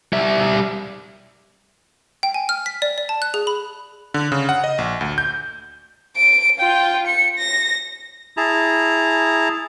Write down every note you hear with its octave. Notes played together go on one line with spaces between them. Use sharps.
G3 E5
G5
G#5
F6
B6
D5
D5
A5
F#6
G#4
B5
D3
C#3
F#5
D#5
A#1
D2
G6
D7
F4 G5
C#7
A#6
E4 G#4 A5 A#5